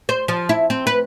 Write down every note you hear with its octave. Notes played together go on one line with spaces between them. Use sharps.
C5
F3
E4
C4
B4